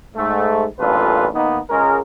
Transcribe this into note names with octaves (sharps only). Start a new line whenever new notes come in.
G#2 A3
A1 G2 A#2 F4 A4 B4
D#3 A#3 B3 D#4
C#2 G#3 C#4 G#4 A#4